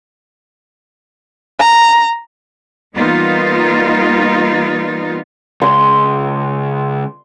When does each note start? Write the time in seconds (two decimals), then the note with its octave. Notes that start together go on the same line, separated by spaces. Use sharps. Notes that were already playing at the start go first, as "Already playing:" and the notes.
1.59 A#5
2.95 E3 G3 A#3 B3 D#4 F4
5.62 C#2 C6